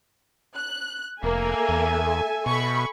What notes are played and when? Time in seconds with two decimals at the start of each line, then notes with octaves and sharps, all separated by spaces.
0.56 F#6
1.23 F1 A#3 A4 E5 G#5
1.69 E2
2.46 B2 B5 C#6